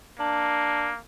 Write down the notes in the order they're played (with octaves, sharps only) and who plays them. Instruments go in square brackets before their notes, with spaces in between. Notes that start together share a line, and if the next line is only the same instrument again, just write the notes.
[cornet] A#3 [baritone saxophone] D4